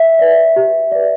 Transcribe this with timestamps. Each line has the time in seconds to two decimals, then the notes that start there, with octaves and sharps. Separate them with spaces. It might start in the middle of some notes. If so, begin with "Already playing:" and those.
Already playing: E5
0.19 B4 D5
0.56 G4
0.92 B4 D5